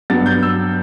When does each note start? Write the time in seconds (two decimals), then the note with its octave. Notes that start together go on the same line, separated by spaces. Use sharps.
0.10 G2 F#3 B3 A6
0.26 G6
0.42 E6